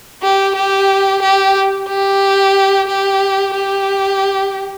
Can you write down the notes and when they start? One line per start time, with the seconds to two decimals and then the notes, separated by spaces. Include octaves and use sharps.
0.22 G4
0.56 G4
1.22 G4
1.88 G4
2.87 G4
3.54 G4